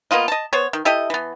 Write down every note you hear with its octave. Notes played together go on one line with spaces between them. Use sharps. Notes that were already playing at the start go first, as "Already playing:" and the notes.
A#3 B3 F4 D#5
D#5 A5
B3 C5 C#5
D#3
E4 G4 A4 D#5
E3 B3